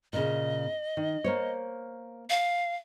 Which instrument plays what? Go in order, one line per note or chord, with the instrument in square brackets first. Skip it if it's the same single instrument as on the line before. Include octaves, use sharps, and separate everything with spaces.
[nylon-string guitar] A#2 C#3 [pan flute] D#5
[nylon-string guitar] D#3
A#3 C5 C#5
[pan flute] F5